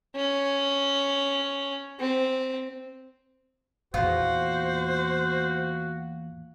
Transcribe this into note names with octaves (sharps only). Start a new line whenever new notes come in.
C#4
C4
E2 A#2 F4 F#4 C5